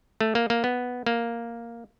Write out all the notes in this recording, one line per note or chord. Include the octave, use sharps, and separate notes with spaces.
A3
A#3
A#3
B3
A#3